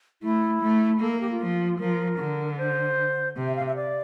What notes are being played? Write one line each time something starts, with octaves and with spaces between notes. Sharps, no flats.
A3 E4
A3
A#3 A4
A#4
G4
F4
F3
F3 A#4
D3
C5
C3
E5
F5
E5
D5